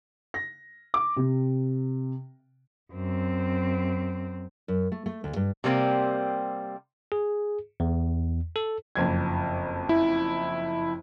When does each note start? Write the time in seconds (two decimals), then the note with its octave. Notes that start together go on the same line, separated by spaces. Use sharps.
0.34 A#6
0.94 D6
1.17 C3
2.93 F#2 C4
4.68 F#2
4.92 A3
5.06 A3
5.24 D2
5.36 G2
5.64 C3 G3 A#3 C4
7.12 G#4
7.80 E2
8.56 A4
8.96 F#1 F2 G#6
9.89 E4